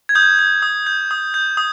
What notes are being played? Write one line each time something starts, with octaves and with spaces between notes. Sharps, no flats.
G#6
D#6 G6
G6
D#6
G6
D#6
G6
D#6